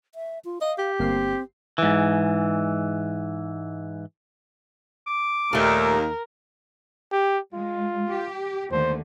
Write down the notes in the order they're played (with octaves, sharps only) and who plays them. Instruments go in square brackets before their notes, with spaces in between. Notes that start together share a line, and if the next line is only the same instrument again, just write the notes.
[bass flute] E5
F4
[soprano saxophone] D#5 [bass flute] F5
[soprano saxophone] G4
[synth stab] G1 A#3 C7 [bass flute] C4
[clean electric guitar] G#2 E3
[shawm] D6
[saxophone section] D#2 [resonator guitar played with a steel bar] A#2 A3 [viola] A#4
[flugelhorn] G4
[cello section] G#3 [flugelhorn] F4
[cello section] G4
[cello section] D#2 D3 A3 [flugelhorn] C5